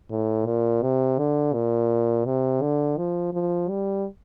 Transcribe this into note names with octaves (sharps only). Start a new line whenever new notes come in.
A2
A#2
C3
D3
A#2
C3
D3
F3
F3
G3